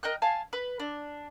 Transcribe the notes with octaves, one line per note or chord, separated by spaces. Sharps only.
A#4 D#5 G5 F#6
F5 G#5 A5
B4
D4